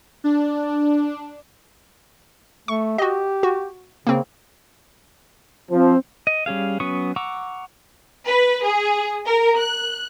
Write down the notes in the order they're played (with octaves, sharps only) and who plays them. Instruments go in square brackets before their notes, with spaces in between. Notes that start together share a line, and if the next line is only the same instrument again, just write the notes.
[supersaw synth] D4
[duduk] A3 [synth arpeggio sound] C#6
[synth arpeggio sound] F#4 D#5 [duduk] G4
[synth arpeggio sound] F#4
[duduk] C#3 [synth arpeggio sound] A#3 C4
[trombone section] F3 [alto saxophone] C4
[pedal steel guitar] D#5
G3 C#4 G#4 F5
F#3 B3 C#4 C#6 D#6
F#5 A#5 C#6 D6 E6
[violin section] B4
G#4
A#4
F#6